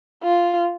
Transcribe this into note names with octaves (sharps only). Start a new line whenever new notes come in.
F4